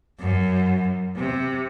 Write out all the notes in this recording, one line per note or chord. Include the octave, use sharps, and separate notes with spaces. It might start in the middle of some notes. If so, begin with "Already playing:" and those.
F#2
C3